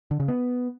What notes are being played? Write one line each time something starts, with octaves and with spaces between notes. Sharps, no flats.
D3
C#3
B3